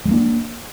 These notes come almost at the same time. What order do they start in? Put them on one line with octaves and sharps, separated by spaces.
G#3 G3 A#3 D4